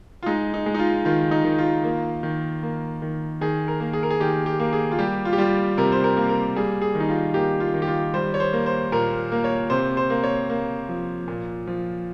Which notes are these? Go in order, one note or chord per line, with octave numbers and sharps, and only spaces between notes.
F4
G#3 D#4
D#4
G#3
D#4
F4
D#3 F4
D#4
D#3
F4
A#3
D#3
A#3
D#3
D#3 G#4
A#4
A#3
G#4
A#4
G#4
D#3 G4
G4
A#3
G#4
F4
G3 G4
F4
G4
G3 F4
C3 A#4
C5
A#4
A#3
A#4
G3 G#4
G#4
D#3
D#4
F4
A#3 G4
F4
D#3
G4
F4
G3 C5
C#5
C5
A#3
C5
A#2 A#4
A#3
C#5
C3 C5
C5
A#3
C#5
A#3
F3
A#2
F3